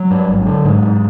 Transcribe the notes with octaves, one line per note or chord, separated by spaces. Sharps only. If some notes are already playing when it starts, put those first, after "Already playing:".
Already playing: F#3
G2
G#1
D3
G#2
G#2